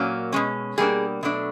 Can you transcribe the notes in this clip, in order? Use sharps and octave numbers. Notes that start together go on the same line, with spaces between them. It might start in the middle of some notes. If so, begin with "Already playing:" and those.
Already playing: A#2 F#3 A#3 C#4
B2 G#3 C#4
B2 G3 A#3 D4 G#4
B2 F#3 A3 D4